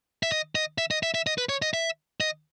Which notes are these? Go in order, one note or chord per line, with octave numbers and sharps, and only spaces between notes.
E5
D#5
D#5
E5
D#5
E5
E5
D#5
B4
C#5
D#5
E5
D#5